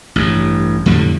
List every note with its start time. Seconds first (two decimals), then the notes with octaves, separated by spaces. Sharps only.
0.16 A1 G2
0.86 F2 A2 D3 G3